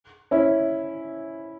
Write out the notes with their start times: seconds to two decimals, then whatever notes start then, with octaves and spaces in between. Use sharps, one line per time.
0.31 C#4 E4